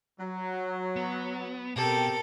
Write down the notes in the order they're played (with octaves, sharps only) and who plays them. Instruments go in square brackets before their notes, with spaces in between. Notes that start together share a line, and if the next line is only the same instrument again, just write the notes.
[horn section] F#3
[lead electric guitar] B3
[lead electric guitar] B2 [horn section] C4 G4 G5 [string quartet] A4 A#4